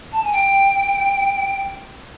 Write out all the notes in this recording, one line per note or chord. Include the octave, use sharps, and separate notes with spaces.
A5
G#5
G5